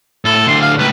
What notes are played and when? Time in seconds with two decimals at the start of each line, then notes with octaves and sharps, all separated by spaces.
0.25 A2 A4
0.48 A2 D3 C6
0.61 F5
0.79 C#2 A2 B4